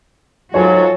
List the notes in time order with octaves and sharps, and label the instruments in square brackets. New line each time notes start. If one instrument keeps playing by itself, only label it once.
[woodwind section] G#2 F#3 [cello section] F4 F#4 A4 [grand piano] C#5 G#5